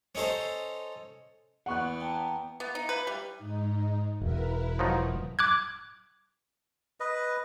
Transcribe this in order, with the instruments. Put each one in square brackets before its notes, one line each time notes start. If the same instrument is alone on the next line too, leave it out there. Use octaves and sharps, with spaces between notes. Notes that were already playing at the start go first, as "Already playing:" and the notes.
[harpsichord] C#4 D#4 A4 C5
[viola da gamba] E2 B3 [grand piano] F#5 C#6 F#6
[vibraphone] G5 A5 A#5
[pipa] B3
D#4
B4
G3
[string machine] G#2 D#4
[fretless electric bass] E1 [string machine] E4 A#4 B4
[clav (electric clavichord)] F3 F#3 D#4
[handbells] D6 F#6 G#6
[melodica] B4 D#5